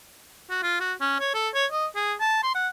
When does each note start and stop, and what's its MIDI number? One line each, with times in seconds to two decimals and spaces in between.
0.50 0.62 66
0.63 0.79 65
0.80 0.93 66
1.01 1.18 61
1.20 1.32 73
1.34 1.49 69
1.54 1.66 73
1.72 1.86 75
1.96 2.13 68
2.20 2.42 81
2.43 2.54 84
2.55 2.68 78